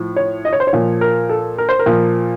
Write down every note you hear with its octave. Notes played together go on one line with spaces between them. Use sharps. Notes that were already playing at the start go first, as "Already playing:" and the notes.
Already playing: A2 F3
C#5
D#5
C#5
C5
C#5
A#2 F3
A#4
A4
A#4
C5
A#4
A#2 F3